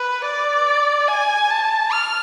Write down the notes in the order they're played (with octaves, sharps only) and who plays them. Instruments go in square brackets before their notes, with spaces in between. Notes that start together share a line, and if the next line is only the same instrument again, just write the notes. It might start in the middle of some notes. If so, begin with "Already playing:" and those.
Already playing: [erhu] B4
D5
G#5
A5
F6